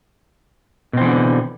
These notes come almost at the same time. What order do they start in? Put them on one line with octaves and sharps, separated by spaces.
B2 C4 E3 D3